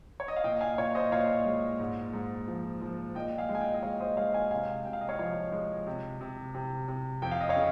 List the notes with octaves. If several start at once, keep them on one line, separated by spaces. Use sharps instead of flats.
C#5
D#5
F5
A#2 D#5 G5
F5 G#5
A#2 C#5
C5 D#5
A#2 C#5 F5
G#3
G#2
G#2
F3
F3
A#2 D#5 G5
F5 G#5
G#3
G#5
D#5 G5
D#5
G#3 C#5 F5
C5 D#5
G#3 C#5 F5
F5 G#5
C3 F5 G#5
C3 G5
F5
D#5
C#5 F5
F3 C#5
G#3
C3
C3
C3
C3
F2 G5
F5
D#5
C#5 F5
C#3